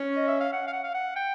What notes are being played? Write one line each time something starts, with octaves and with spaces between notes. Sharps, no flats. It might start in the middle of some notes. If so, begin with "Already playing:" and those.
Already playing: C#4
D#5
E5
F5
F#5
F5
F#5
F5
F#5
G5